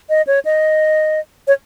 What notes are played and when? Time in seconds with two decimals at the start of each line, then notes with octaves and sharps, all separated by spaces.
0.10 D#5
0.27 C#5
0.45 D#5
1.47 C#5